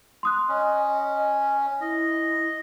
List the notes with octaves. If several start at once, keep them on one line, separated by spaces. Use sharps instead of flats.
C6 D#6 F#6
C#4 D#5
E4 D#5